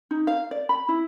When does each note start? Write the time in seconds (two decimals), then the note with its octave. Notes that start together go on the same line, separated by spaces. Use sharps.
0.11 D#4
0.27 F5
0.51 D5
0.69 B5
0.89 E4